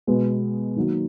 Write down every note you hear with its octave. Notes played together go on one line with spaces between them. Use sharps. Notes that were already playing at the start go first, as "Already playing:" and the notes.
B2 G#3 B3
D#3 F#3 A#3